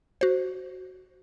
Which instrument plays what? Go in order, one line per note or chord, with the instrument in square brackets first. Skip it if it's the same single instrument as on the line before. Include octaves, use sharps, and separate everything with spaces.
[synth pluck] F#4 C5